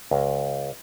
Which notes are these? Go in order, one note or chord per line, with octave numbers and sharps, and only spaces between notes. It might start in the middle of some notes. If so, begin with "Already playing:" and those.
C#2